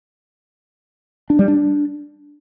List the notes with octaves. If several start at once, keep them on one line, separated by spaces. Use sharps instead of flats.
D4
G3
D4